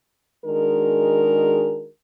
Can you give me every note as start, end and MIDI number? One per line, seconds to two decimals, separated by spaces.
0.45 1.88 51
0.45 1.88 56
0.45 1.88 62
0.45 1.88 66
0.45 1.88 68
0.45 1.88 70